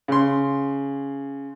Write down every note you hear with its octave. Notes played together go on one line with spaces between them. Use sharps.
C#3 C6